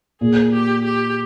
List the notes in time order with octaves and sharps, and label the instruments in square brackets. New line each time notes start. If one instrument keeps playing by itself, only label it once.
[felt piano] A#2 [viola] G#4
[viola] G4
G4